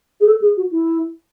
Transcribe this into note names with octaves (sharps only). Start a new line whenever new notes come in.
G#4
A4
G#4
F#4
E4